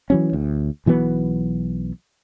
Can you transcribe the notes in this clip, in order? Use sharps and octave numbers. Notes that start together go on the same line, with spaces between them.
E3 F#3 C#4
D2
B1 E3 F#3 B3